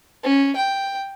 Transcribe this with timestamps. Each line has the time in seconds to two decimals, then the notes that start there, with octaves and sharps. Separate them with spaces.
0.24 C#4
0.56 G5